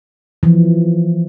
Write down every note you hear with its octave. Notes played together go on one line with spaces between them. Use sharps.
E3 F3